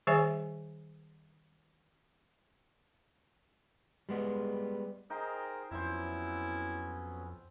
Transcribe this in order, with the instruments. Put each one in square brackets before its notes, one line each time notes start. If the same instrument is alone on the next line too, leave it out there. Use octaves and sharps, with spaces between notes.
[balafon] D#3 G3 G#4 C#5 E5 G#5
[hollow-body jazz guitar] G3 G#3 B3
[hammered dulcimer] D#4 G5 A#5 [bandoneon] G#4 A#4 C5
[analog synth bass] F2 [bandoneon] F#3 B3 C#4 [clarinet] E4 [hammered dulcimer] C5 E5